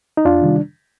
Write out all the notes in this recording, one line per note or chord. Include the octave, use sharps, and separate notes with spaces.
D#4
F2 D4 F4
C3 D#3 G3